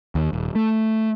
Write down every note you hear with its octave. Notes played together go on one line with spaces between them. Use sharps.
D#2
D#1
A3